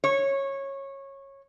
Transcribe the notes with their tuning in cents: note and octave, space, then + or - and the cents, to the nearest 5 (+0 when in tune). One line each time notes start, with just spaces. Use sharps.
C#5 -15